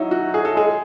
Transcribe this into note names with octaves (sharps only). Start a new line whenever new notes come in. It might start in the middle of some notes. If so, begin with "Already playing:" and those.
Already playing: F#3 D#4 E4
F#4
G#4
A3 A4
G#3 G#4